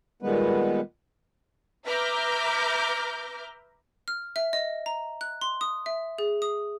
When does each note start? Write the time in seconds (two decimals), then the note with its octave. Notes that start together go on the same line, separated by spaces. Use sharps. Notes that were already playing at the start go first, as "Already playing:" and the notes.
0.22 A#2 D#3 G3 G#3 B3 B4
1.85 B4 E5 A#5 D6 F6 G6
4.08 F6
4.36 E5
4.53 D#5
4.86 A#5
5.21 F#6
5.41 C6
5.61 D#6
5.86 E5
6.18 G#4
6.42 D#6